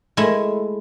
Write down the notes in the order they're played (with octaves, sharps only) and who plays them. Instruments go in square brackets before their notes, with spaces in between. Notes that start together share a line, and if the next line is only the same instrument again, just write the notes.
[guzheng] G#3 A3 E4